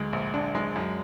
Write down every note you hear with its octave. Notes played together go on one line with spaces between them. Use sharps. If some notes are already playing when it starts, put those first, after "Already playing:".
Already playing: D2 G#3
A#1
D4
G#3
F#2